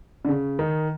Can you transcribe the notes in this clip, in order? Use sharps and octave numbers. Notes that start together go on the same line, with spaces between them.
D3
C#3
D#3